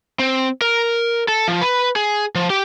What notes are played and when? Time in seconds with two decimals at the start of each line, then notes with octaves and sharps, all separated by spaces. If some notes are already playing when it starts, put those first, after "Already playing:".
0.19 C4
0.62 A#4
1.28 A4
1.48 F3
1.61 B4
1.96 G#4
2.35 F3
2.50 G4